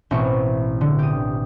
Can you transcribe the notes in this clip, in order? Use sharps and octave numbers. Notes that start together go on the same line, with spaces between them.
A1 B2 C4 E4 C#6
D3
G4 D#6